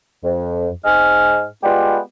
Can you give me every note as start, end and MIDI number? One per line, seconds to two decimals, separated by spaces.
0.24 0.68 41
0.85 1.43 44
0.85 1.43 75
0.85 1.43 80
0.85 1.43 89
1.64 1.99 56
1.64 1.99 59
1.64 1.99 65
1.64 1.99 67
1.64 1.99 71
1.64 1.99 74